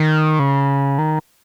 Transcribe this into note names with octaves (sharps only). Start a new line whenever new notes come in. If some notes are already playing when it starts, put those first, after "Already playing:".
Already playing: D#3
C#3
D#3